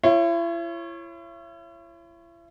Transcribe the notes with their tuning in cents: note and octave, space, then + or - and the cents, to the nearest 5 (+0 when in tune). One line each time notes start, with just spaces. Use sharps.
E4 +40 C#5 -20